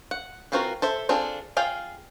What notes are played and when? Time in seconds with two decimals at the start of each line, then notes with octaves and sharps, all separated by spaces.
0.11 F#5
0.52 E3 C4 F4 F#4 A#4
0.82 A4 C5 E5
1.09 C4 D4 F4 G#4 A4
1.57 F4 G#4 F5 G5